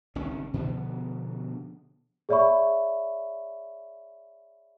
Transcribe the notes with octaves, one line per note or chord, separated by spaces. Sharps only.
G1 C2 D#3 C#4
B2 D3 F3 B3
G#4 C#5 D5 E5 B5 C#6